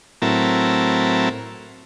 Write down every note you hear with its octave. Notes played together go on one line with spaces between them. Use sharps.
A2 F#3 C4 E4 A#4 A5